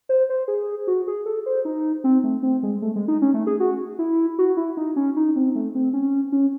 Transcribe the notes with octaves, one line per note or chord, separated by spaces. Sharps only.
C5
C5
G#4
F#4
G#4
A4
C5
D#4
C4
A3
C4
G#3
A3
G#3
D#4
C#4
A3
G#4
F#4
E4
F#4
E4
D#4
C#4
D#4
C4
A3
C4
C#4
C#4